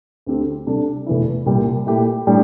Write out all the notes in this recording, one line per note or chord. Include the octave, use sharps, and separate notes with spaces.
D2 D3 A3 C4 G4
C3 G3 D4 A4
F1 E2 E3 A3 E4
C2 A#2 G3
A#2 A3 E4 G4
A2 G3 D4